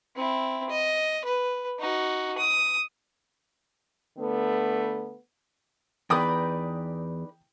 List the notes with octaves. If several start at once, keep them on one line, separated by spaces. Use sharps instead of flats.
C4 E4
D#5
B4
D#4 F#4
D#6
D3 A3 B3
E2 D#4 B4 D5 G5 D#6